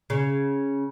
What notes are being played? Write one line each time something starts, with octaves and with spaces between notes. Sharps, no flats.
C#3